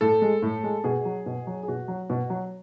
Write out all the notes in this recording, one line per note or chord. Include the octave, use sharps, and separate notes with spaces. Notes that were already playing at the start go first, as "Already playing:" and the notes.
A2 A4
G#3
A2
G#3
B2 G#4
F#3
B2
F#3
G#4
B2 F#4
F#3
B2
F#3